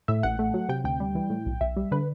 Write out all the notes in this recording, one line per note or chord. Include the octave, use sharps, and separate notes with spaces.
A2 E5
A1 F#5
A3
F#3
C3 G5
D2 G5
G3
E3
A2
B1
B1 E5
G3
D3 B4